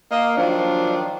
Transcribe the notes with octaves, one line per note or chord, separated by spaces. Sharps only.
A#3 D#5
D#3 F3 F#3 D4